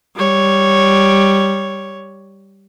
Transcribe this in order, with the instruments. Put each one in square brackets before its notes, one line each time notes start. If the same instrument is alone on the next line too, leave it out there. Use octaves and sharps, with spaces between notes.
[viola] G3 C#5